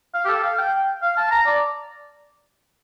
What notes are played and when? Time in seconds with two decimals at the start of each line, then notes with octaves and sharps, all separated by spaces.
0.14 F5
0.25 G4
0.28 A4
0.43 F5
0.58 G5
1.02 F5
1.17 A5
1.31 A#5
1.46 D5